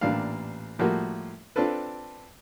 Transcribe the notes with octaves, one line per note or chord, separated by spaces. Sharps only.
A1 A#2 D4 F5
A2 F3 G3 A#3 F#4
C4 D4 F4 A4 B4